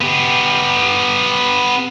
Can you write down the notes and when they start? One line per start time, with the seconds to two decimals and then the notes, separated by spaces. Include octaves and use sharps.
0.01 B3 G4